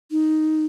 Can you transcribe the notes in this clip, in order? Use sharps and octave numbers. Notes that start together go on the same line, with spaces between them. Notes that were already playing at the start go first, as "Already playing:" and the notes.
D#4